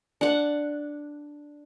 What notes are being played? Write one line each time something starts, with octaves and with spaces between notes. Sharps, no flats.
D4 F#5